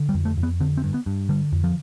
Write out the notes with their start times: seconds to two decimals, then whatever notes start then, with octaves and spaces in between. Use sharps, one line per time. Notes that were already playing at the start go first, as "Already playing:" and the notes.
Already playing: D3
0.09 G3
0.14 F2
0.25 A3
0.37 F2
0.43 B3
0.60 D3 C4
0.77 C4
0.84 G2
0.94 B3
1.06 G2
1.29 D3 G3
1.52 F2
1.64 F3